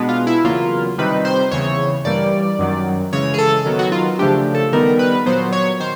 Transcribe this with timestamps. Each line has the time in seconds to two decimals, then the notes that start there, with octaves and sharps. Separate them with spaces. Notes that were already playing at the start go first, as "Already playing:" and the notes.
Already playing: B2 G#3 B3 D4
0.09 F4
0.27 E4
0.44 E2 C#3 F#3 A#3 F4
0.98 C3 D#3 G3 C4 D#4 B4
1.25 C5
1.51 E2 C#3 E3 C#5
2.05 G2 E3 G3 A#3 D5
2.59 F#2 D#3 F#3
3.13 C#3 E3 G#3 C#5
3.34 G#4
3.38 A4
3.65 D#3 F#3 B3
3.79 F#4
3.92 F4
4.19 C#3 F3 A3 D4 G4
4.54 A4
4.72 D#3 G3 B3 D#4 A#4
4.99 B4
5.26 A#2 F#3 B3 C5
5.52 C#5
5.80 D#3 C5